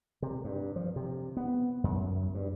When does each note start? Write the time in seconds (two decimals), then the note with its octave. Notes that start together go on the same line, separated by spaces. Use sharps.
0.22 C3
0.44 G2
0.76 F3
0.96 C3
1.37 B3
1.84 F#2
2.35 G2